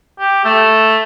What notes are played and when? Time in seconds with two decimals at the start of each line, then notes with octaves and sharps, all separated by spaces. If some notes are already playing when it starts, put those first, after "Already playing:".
0.19 G4
0.45 A3